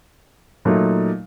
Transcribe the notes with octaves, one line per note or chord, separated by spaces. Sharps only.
A#2 F#3 A3 D#4